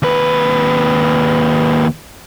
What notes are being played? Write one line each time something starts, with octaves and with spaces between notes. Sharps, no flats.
D#2 B4